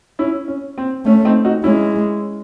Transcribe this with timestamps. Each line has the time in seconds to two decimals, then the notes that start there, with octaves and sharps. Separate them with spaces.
0.19 C#4 E4
0.48 C#4
0.78 C4
1.06 A3 C#4
1.25 C4 D#4
1.45 D#4 F#4
1.64 G#3 C#4 E4